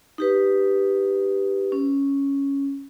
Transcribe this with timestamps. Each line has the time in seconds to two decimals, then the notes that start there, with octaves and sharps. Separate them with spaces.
0.18 D#4 G4 B4
1.72 C#4